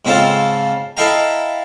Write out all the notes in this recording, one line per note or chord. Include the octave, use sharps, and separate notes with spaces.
G#2 C#3 C4 F4 A4 F5
E4 A4 D#5 F5 G5 A#5